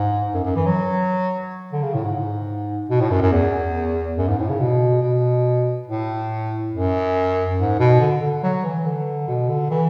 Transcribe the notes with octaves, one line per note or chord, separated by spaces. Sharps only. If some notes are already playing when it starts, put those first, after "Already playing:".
Already playing: G#2
F#2
F#2
E3
F#3
D3
C#3
A2
G#2
B2
A2
F#2
F#2
E2
F#2
G#2
A2
C#3
B2
B2
A2
F#2
G#2
B2
D3
D3
F#3
E3
D3
B2
D3
E3